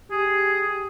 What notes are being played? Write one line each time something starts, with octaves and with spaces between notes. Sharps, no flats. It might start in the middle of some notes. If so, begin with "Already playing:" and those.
G4 G#4